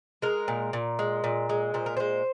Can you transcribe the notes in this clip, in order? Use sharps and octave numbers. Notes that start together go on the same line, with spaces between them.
G#3 A#4
A#2
A#2
G#3
A#2
G#3
A#2 C5
A#4
G#3 C5